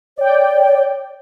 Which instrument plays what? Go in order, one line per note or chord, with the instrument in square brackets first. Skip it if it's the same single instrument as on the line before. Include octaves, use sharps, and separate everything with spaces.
[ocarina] C#5 [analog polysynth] D5 G5